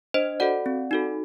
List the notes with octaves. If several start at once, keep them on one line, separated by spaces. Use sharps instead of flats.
D4 C5 D#5
F#4 A4 D5 F#5
C4
D#4 F#4 A4